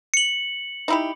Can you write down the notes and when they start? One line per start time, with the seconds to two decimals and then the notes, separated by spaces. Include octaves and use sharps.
0.14 C#7 F#7
0.88 D#4 E4 G4